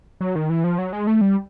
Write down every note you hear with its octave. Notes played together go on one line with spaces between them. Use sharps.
F#3
D#3
E3
F3
F#3
G#3
A3
G3